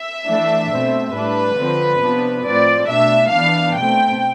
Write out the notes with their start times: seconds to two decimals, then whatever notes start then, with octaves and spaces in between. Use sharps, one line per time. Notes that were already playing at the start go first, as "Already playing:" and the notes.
Already playing: E5
0.26 E3 A3 D4
0.70 B2 A3 C4
1.14 A2 G3 D4 B4
1.57 D3 F3 C4
2.01 C3 F3 B3 D4
2.45 A2 F3 C4 D5
2.89 B2 A3 D4 E5
3.33 E3 B3 D4 F5
3.76 B2 A3 C4 G5